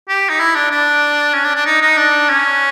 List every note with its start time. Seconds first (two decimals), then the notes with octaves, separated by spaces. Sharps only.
0.08 G4
0.29 D#4
0.40 E4
0.55 D4
0.71 D4
1.33 C#4
1.45 D4
1.55 D4
1.66 D#4
1.81 D#4
1.97 D4
2.29 C#4